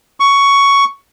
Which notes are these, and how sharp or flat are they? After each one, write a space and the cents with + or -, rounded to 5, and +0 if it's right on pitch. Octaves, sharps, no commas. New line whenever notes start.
C#6 +10